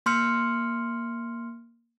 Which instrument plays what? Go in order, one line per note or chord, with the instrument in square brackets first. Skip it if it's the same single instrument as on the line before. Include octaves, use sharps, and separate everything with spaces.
[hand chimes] A#3 C6 F6 C#7